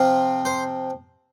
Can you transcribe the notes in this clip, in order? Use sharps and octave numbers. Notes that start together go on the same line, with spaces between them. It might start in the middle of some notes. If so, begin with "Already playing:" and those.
Already playing: C3 F3 C4 F4
C5